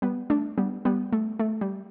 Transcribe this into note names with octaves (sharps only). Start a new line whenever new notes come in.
G3 B3
A3 D4
G3 B3
G3 B3
A3
A3
G3